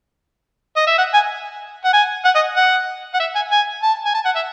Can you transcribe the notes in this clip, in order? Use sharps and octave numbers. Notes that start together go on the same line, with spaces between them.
D#5
E5
F#5
G#5
F#5
G#5
F#5
D#5
F#5
F#5
E5
G#5
G#5
A5
G#5
A5
F#5
E5